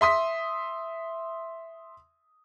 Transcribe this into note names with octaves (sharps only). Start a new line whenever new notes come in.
E5 C6 D#6 B6